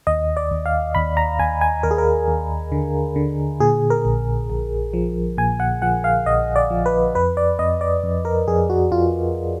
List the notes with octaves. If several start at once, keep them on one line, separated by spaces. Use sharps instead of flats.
D#2 D#5
D5
D#2
F5
D#2 B5
A#5
D#2 G#5
G#5
D#2 A#4
G#4
A#4
D#2
D3
D3
A#2 G#4
A#4
A#1
A#1
F3
A#2 G#5
F#5
F3 F#5
F5
A#1 D#5
D5
F3
B4
F2 B4
D5
F2 D#5
D5
F2
A#4
F2 G#4
F#4
F2 F4